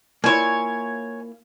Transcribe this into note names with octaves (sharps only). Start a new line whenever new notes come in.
A#3 E4 F4 C#5 G#5